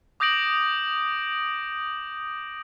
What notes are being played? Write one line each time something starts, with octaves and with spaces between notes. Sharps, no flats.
D6 D#6 G6 A#6 D7 F#7